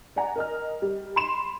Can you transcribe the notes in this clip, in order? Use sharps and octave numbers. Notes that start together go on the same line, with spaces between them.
D5 F#5 G#5 A#5
A#4 D#5 F6
G3
B5 C6 E7